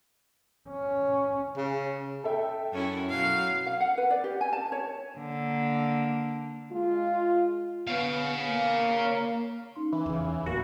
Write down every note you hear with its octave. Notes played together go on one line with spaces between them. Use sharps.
C#4
C#3
A4 E5 G5
F#2 C#4 E4
B2 F#3 F5
F5
F#5
B4
D5
G4
G#5
A5
C#5
D3 A#3
G#3 F4
B3 C#5 F5
A#3
C#4 D#4 C6
E3
E2 C#3
D#2 G#5
D1 A1 E2 A2 A#3 F#4